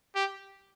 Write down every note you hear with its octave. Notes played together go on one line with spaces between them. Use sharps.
G4